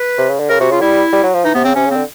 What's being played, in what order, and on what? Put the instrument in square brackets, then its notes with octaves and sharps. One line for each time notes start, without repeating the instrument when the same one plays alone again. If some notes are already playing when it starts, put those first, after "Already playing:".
Already playing: [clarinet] B4
[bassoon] C3
C#3
D3
[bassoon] C#3 [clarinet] A#4
[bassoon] C3 [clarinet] F#4
[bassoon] C#3 [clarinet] F4
[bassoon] G3 [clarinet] E4
[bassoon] G3
F#3
F3
[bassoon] E3 [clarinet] D#4
[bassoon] C3 [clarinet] B3
[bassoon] C#3 [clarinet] C4
[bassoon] C3 [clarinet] C#4
[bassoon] C#3
[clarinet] C4
[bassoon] D3